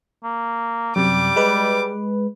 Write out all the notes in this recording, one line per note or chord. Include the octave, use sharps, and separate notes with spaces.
A#3
F#2 C3 G3 D6
G#3 B4